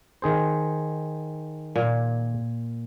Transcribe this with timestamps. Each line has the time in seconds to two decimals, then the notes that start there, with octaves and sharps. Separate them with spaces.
0.22 D#3 G#4 C5
1.76 A#2